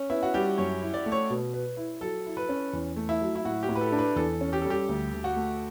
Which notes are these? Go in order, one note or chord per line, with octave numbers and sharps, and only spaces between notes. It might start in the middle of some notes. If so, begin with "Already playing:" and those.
Already playing: C#4
B3 E4
F#4
G3 G4
F#2 C#5
E4
D5
A3
C#5
B2
B4
E4
F#3 A4
E4
B4
C#4
E2
A3
E4
F#3
E4
A2 F#4
G4
A2
B4
A4
D4
B4
E2 A4
C#4
G4
G3 A4
G4
D2
D2
F#4
A3